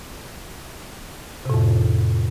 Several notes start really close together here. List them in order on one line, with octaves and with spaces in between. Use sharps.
C3 A2 F2